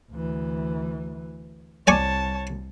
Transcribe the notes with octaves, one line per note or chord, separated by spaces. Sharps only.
D2 E3
C2 C#5 D5 G#5 A5 C#6